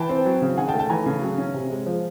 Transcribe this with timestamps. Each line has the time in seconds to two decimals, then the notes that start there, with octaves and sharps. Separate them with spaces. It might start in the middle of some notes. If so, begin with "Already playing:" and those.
Already playing: E3 G5 A5
0.09 C4
0.25 F#3
0.42 C#3
0.57 D#3 F#5 G#5
0.68 G5 A5
0.74 A3
0.79 G5 A5
0.90 E3 G#5 A#5
1.06 C#3
1.22 F#3
1.38 C#4
1.54 C3
1.70 G#3
1.86 F3